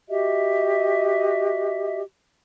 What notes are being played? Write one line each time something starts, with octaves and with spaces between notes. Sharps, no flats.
F#4 G4 D#5 E5